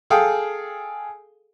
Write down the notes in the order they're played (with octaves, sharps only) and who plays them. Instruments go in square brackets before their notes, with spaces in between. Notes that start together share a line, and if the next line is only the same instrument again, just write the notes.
[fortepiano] G#4 A4 F5 G5 D#6